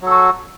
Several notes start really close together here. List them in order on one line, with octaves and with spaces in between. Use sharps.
F#3 A4 F#4